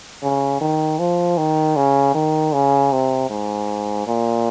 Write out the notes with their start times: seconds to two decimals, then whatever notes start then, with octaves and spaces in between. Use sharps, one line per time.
0.23 C#3
0.61 D#3
0.99 F3
1.38 D#3
1.76 C#3
2.14 D#3
2.54 C#3
2.92 C3
3.30 G#2
4.07 A#2